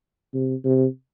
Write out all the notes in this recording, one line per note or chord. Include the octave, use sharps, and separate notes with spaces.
C3
C3